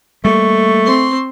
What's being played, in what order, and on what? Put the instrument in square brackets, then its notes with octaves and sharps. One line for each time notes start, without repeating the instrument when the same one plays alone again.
[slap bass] G3 A#3 [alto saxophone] A3 [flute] C#6
[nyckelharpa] C4 C6